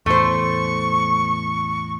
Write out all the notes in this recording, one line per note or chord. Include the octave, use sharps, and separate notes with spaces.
E2 A2 A3 C5 C#6